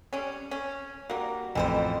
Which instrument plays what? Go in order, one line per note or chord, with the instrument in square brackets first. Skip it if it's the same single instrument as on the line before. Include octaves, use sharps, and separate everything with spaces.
[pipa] G3 C#4
C#4
[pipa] G3 A#3 [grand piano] F#4
[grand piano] A1 F2 [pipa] E3 A4 C5